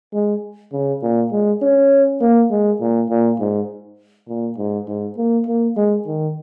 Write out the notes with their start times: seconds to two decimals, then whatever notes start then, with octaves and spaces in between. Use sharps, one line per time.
0.14 G#3
0.72 C#3
1.03 A#2
1.32 G#3
1.62 C#4
2.21 A#3
2.50 G#3
2.80 A#2
3.10 A#2
3.40 G#2
4.29 A#2
4.58 G#2
4.88 G#2
5.17 A#3
5.47 A#3
5.77 G#3
6.07 D#3